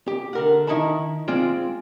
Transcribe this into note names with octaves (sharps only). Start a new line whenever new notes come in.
G4
D3 A#4 F#5
D#3 C#4 D#4 E4 A5 B5
G#3 C4 F4 D5